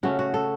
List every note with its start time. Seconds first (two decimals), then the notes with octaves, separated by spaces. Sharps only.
0.03 C#3 A3 C#4 F#4
0.19 F#4
0.34 A4